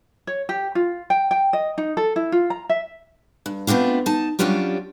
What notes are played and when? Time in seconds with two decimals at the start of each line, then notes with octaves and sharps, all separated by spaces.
0.27 C#5
0.49 G4
0.75 F4
1.10 G5
1.31 G5
1.53 D#5
1.78 D#4
1.97 A4
2.16 E4
2.32 F4
2.50 A#5
2.69 E5
3.46 G2
3.67 A3 B3 C4 D4 F4
4.06 D#4 A5
4.39 F#3 G3 C#4 D4 F4 G4